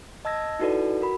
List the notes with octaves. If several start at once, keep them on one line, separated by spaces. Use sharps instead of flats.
D#5 A5 E6 G#6 A#6
D#4 E4 F#4 A4 B4 D5
F#4 A#4 B5